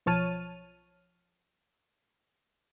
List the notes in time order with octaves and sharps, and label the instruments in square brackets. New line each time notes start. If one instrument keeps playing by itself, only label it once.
[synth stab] B1 F3 C#5 A5 F6 D#7